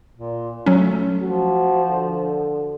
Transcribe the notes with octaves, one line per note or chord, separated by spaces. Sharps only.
A#2
F#3 A3 C#4
F3 F#4
D3